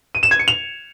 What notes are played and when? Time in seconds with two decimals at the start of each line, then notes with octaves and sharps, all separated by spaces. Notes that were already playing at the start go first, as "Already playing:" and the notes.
0.15 D#7
0.23 E7
0.31 G#6
0.39 C#7
0.48 F7